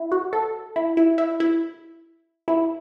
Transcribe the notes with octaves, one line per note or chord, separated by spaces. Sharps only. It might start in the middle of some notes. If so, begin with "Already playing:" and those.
Already playing: E4
F#4
A4
E4
E4
E4
E4
E4